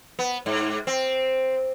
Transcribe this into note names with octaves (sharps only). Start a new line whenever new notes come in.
B3
G#2
C4